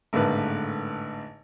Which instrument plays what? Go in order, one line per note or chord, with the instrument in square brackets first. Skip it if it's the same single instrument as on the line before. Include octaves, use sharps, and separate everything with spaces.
[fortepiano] G#1 A2 D3 A#3 B4